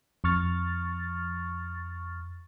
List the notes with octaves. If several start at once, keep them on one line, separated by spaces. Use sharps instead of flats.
F2 C#6 F6 A6